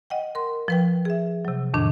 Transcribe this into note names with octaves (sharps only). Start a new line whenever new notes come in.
D#5 F#5 G5
A#4 C6
F3 B4 G5
G#4 E5
C3 F#3
F2 A2 D#3 D4